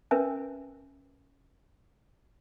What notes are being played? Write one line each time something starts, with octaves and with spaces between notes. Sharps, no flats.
C#4 A#4 B4 E5 G#5